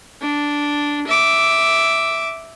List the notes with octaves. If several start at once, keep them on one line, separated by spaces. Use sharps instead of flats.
D4
E5 D6